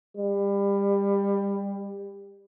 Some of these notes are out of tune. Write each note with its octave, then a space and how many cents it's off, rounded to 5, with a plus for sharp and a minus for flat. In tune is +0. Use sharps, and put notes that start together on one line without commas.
G3 +25